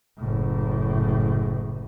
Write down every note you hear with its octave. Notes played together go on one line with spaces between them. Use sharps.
F#1 A2